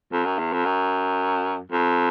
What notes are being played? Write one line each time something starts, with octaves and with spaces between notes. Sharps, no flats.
F2
F#2
E2
F2
F#2
F2